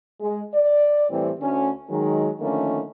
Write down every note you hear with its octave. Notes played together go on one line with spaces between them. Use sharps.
G#3
D5
A2 E3 G3 C4
D2 C#4
D#3 F#3 G#3
D3 D#3 F3 A3 A#3 C#4